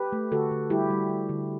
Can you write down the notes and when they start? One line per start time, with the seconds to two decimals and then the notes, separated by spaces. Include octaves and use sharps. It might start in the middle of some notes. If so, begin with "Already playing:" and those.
Already playing: G4 B4
0.12 A3
0.31 D3 F#4 A4
0.51 D3
0.70 G3 E4 G4
0.90 G3
1.09 D3
1.29 D3